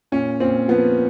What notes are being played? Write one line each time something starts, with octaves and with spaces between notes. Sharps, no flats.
A#2 C#4
A#2 C4
F3 B3